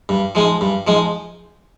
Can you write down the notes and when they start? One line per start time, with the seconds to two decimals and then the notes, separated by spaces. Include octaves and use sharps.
0.09 G2
0.35 F3 G#3 D#4
0.61 G2
0.87 F3 G#3 D#4